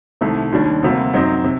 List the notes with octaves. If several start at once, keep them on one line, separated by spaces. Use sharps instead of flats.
C2 C3 D#3 A3
D#2 D#3 G3 D4
D2 C3 G3 A#3
F#2 F#3 C4 D#4
C3